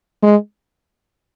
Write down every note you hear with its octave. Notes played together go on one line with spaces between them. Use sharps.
G#3